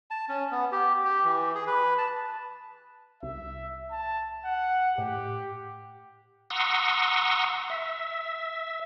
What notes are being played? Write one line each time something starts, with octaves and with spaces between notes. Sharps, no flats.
A5
C#4
B3
G4
G4
E3
G#4
B4
A5
C2 E5
A5
F#5
A2 G4
F#5 A#5 C6 C#6 D#6 E6
E5